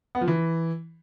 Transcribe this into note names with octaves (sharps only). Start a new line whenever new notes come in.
B3
F3
E3